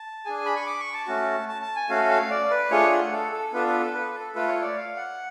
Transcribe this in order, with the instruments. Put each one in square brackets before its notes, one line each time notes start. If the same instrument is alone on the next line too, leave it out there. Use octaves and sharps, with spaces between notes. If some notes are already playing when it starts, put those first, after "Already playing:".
Already playing: [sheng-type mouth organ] A5
D4 G#4 G#5
B5
C#6
D6
C#6
A5
A3 C#4 F#4
A5
A5
G#5
A3 C#4 F#4 A4 F5
F5
D5
B4
A3 D4 F4 G#4 C#5
F#5
A4
A4
B3 D4 F4 A4 B4
B4
A4
B4
A4
A3 F4 A4 B4
C#5
D5
F5
F#5